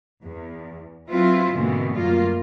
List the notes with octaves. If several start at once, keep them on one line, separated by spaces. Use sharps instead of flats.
E2
F#3 C4 E4 F4 B4
G#2 B2 D3 E3 A#3 C4
F#2 G3 A3 A#3 F4